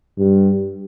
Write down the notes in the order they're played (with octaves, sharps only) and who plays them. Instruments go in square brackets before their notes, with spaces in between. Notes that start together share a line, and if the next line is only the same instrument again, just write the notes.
[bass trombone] G2